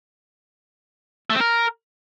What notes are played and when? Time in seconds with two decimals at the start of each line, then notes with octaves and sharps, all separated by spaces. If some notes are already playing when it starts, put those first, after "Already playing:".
1.30 A3
1.35 C4
1.40 A#4